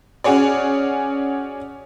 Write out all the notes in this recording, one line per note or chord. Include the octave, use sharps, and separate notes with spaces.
C#4 F#4 G#4 C#5 D5